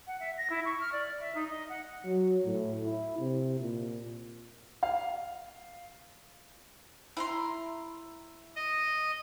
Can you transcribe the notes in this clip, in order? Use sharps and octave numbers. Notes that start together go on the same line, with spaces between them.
F#5
E5
A#6
E4
C#6
F6
D5
E5
D#4
D#5
F#5
F#3
A2
E4
C3
A#2
F5
E4 A#5 C6
D#5